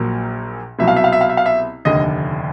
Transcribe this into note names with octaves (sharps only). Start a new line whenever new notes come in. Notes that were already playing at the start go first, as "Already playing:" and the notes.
Already playing: A#1 A#2 F#3 A#3
C2 B2 F#3 E5
F5
E5
F5
E5
F5
E5
F5
E5
F1 D#2 D3 D#5